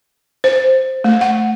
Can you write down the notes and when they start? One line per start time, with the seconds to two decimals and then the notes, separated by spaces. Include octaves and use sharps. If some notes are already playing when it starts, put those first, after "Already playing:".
0.44 C5
1.04 A3
1.21 F#5